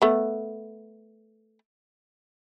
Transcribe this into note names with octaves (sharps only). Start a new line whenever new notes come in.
A3 B3